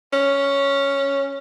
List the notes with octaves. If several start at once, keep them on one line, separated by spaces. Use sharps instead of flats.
C#4